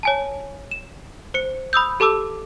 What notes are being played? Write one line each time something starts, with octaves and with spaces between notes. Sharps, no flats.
C#5 G#5 A5
E7
C5 C#7
B5 D#6 E6 G6
G4 A4 A5 D6 E6